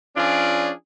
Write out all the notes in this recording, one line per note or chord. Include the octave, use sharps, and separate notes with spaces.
F3 C#4 D4 F4 G#4 D5